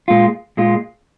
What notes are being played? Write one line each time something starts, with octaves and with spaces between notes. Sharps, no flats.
A#2 G#3 F4
A#2 G#3 F4